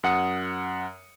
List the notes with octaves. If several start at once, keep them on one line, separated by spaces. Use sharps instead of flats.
F#2 F#5 D#6 C#7